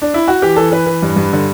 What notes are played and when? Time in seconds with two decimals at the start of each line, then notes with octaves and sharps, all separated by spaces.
0.02 D4
0.14 E4
0.28 F#4
0.42 E3 G4
0.56 E3 A4
0.71 E3 B4
0.86 E3
1.02 G2
1.16 G2
1.33 D3